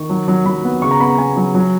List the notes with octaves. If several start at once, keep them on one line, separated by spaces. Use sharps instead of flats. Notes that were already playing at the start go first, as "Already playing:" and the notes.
Already playing: D#3 C#6
F#3
F#3
F#3 B5
B3
C#3 C#6
A#5
B3 B5
A#5
B3 G#5
F#3
F#3